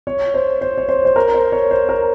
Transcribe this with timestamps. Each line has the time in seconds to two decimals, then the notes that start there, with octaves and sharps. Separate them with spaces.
0.07 C#5
0.34 C5
0.61 C5
0.78 C#5
0.89 C5
1.05 C5
1.16 A#4
1.34 C5
1.52 C#5
1.71 C5
1.89 A#4